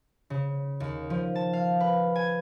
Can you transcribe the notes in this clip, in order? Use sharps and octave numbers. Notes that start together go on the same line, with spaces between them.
C#3
D#2
F3
A5
F5
B4
G#5